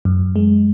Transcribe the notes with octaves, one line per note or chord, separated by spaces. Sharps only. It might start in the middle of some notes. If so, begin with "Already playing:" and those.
F#2
G#3